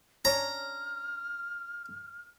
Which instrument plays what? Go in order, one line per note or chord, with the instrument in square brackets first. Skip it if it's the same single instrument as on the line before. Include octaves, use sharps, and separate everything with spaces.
[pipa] C#4 D4 C#5 [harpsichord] A#5 [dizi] F6